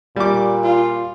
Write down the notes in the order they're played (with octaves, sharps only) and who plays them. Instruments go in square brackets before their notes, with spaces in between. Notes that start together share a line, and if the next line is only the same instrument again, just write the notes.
[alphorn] A#2 [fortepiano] G3 D6
[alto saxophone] F4